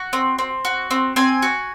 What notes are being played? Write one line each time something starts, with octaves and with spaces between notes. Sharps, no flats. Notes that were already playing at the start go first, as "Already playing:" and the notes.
Already playing: F#4
C4
C4
F#4
C4
C4 G#5
F#4